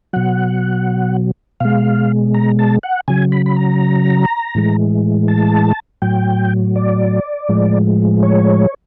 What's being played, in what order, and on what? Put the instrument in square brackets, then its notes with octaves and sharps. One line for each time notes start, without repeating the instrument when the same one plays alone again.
[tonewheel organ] B2 F#3 F#5
B2 G#3 F5
A#5
A5
F#5
C#3 F#3 G#5
B5
B5
A#5
A2 E3 G#3
A5
A2 F#3 G5
D5
A2 F3 G#3
C#5